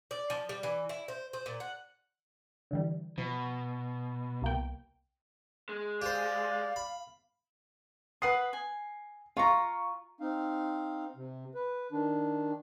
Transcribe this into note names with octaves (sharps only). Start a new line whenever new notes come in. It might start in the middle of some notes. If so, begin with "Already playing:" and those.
D5
F3
G3
E3
E4
C5
C5
A#2
F#5
D3 E3 G3
B2 F3
C2 A#3 G5
G#3
G4 C5 D5 F5
B5
B4 F#5 D#6 C7
G#5
F4 F5 A#5 C#6
C4 D#4 F5
C3
B4
D#3 D4